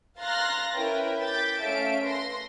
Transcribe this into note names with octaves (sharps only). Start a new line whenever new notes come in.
F5 A#5 C6 F#6 A6 A#6
C#4 E4 A#4 B4 G5
D6 G6 A6 B6
A3 C#4 A4 E5 F5 D7
B4 C6 A#6